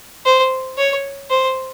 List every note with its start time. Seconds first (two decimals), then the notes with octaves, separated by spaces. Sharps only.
0.25 C5
0.77 C#5
1.30 C5